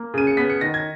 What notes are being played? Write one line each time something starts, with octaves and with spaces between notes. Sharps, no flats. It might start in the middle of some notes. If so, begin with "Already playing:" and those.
Already playing: A#3
C#3 D#7
C#7
B3 B6
C#7
D#3 A#6
G#6